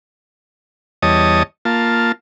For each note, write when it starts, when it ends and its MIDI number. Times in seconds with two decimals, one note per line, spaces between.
1.02 1.43 40
1.02 1.43 55
1.02 1.43 73
1.02 1.43 75
1.02 1.43 81
1.02 1.43 87
1.65 2.12 58
1.65 2.12 65
1.65 2.12 81